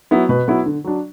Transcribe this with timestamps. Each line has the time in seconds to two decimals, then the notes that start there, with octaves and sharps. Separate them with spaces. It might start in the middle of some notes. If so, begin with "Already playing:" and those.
0.11 F#3 B3 E4
0.29 B2 B4
0.48 F#3 B3 E4
0.66 D3
0.84 F#3 D4